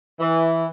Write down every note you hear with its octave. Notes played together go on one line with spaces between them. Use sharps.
E3